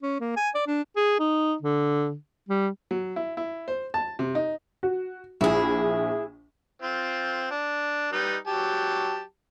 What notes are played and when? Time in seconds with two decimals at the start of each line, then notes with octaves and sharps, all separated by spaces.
0.02 C#4
0.20 A#3
0.37 G#5
0.55 D5
0.67 D4
0.96 G#4
1.19 D#4
1.62 D3
2.49 G3
2.91 F#3
3.16 E4
3.37 E4
3.68 C5
3.94 A5
4.19 C3
4.35 D#4
4.83 F#4
5.41 A#1 E4 G#4
6.82 C4 F4
7.51 D4
8.13 G3 D#4 B4
8.47 F#3 G4 A5